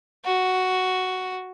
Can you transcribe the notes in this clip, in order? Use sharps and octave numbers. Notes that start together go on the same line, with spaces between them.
F#4